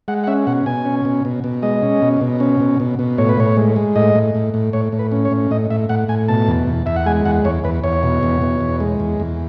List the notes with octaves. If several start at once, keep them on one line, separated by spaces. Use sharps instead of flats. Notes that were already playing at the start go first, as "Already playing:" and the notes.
G#3 F#5
F#5
C#4 E5
B2 F#5
B2 G#5
C#4
B2
B2
B2
G#3 D#5
C#4
B2
B2
C#4
B2
B2
B2
A2 C#5
B4
A2 C#5
G#3
G#3
A2 D#5
A2
A2
A2
A2 C#5
A2
B4
C#4
C#5
A2
A2 D#5
A2 E5
A2 F#5
A2 G#5
B2 A5
E2
E2
E2 E5
F#5
G#3 G#5
E2 F#5
E2 C#5
E2 B4
E2 C#5
B2
E2
B2
E2
G#3
E2
E2